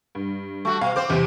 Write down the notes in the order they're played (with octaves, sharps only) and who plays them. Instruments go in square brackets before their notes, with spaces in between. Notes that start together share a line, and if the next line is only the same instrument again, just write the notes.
[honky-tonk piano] G2
[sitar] A3 F#4
[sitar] B2 [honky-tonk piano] F5
[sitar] C4 C5 [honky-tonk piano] D6
[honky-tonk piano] E2 C3